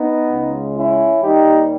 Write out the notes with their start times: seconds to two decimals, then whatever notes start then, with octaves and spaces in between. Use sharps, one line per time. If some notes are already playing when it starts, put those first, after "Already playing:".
Already playing: B3 D#4
0.32 C#2 C#3 G#3
0.77 C#4 E4
1.21 D#2 D#3 G3 D#4 G4